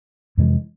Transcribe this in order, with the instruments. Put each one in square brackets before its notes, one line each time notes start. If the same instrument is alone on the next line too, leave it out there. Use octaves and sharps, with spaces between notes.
[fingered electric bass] F2 C3 E3 G#3